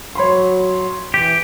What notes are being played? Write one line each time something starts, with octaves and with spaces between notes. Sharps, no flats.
F#3 C#5 B5 C6
E3 G4